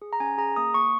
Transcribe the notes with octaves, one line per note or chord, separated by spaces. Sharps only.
G#4
A#5
C#4 G#5
G#4 A#5
A#3 D#6
A#3 C#6